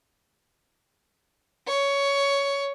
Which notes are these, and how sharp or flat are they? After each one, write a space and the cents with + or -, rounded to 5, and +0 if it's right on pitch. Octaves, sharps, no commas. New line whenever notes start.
C#5 +10